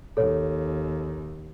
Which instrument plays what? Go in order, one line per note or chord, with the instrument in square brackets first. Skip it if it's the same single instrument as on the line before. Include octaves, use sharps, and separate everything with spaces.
[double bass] D#2 [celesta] A4 C#5